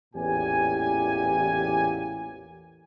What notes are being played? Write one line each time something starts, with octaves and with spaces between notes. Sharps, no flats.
A1 E2 A#2 G4 G#5